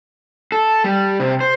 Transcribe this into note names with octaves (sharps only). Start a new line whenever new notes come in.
A4
G3
C3
C5